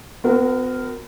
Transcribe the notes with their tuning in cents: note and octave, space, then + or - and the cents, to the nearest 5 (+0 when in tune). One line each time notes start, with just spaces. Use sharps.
B3 +45 F#4 -20 A#4 -5